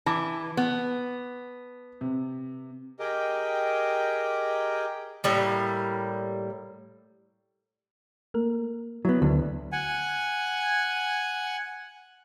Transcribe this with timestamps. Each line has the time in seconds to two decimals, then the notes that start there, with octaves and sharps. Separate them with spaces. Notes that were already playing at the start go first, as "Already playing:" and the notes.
0.06 E3 A5 B5 D6
0.57 B3
2.01 C3
2.99 G4 G#4 A#4 D#5 G5
5.24 A2 G3 A#3
8.34 A3 A#3 A#4
9.05 F#3 B3 E4
9.22 D2 D#3 A3 E4
9.72 F#5 G#5